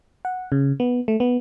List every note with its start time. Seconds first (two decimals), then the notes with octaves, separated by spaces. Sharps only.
0.25 F#5
0.52 C#3
0.80 B3
1.08 A3
1.20 B3